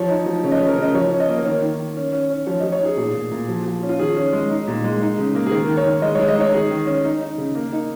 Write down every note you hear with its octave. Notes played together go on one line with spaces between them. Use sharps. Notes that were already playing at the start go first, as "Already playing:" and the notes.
Already playing: F3 C#5
D#4
F3
C#3 C#5
D#5
C#3 C#5
A#4
C#3 D#5
F3 C#5
C#4
D#5
A#3
A#4
D#3 C#5
D#3
D#3
C#4
C#4
C#4
F3 C#5
F3 D#5
C#5
D#4 G#4
A#2 G#4
A#2
A#2
F3
F3
C#4
F4
D#3 G#4
C#4
G#3
D#4
A#2
G#3
D#4
C#3
A#3
G#4
D#3 A#4
D#3
C#5
D#3
G#3 D#5
G#3 C#5
D#5
D#4 C#5
D#3 G#4
D#3
C#4
D#4
D#4
C#3
A#3
D#4